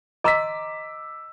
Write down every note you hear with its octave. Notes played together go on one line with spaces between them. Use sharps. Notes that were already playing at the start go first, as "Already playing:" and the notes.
D#5 A#5 C6 D6 E6 B6